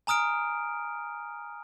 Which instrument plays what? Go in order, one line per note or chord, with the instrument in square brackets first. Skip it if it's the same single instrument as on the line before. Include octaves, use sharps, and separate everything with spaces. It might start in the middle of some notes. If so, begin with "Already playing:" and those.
[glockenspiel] G#5 A#5 D#6 F6 D7